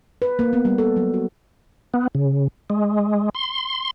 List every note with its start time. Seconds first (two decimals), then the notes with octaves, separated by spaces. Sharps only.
0.22 B4
0.39 A#3
0.53 B3
0.65 G3
0.78 A4
0.96 F#3
1.14 F#4
1.94 B3
2.15 C#3
2.70 G#3
3.35 C6